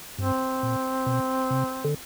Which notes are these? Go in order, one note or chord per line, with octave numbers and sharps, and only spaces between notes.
G2 C4
A#2
B2
C3
D3